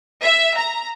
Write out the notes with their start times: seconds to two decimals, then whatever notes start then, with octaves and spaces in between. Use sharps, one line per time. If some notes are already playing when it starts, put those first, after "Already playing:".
0.23 E5
0.56 A#5